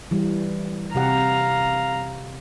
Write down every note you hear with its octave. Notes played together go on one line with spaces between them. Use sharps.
E3 G3
C3 G4 F5 F#5 A#5